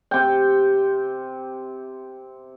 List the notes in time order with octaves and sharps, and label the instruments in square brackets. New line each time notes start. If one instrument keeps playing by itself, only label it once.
[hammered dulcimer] C3 G5